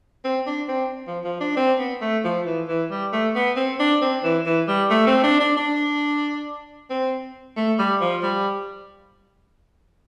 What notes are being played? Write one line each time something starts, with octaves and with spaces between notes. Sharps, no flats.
C4
D4
C4
F3
F3
D4
C4
B3
A3
F3
E3
E3
G3
A3
B3
C4
D4
C4
E3
E3
G3
A3
C4
D4
D4
D4
C4
A3
G3
F3
G3